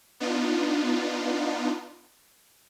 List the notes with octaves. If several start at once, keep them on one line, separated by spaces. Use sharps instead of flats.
B3 D4 D#4 F4